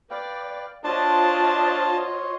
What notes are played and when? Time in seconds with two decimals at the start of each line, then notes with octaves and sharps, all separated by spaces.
0.11 B4 D5 F5 G5
0.85 D4 F4 F#4 C5 C#5 D#5 A5 C6